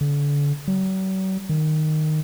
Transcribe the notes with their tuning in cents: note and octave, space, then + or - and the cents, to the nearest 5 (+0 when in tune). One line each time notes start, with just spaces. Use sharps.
D3 -35
F#3 +45
D#3 -10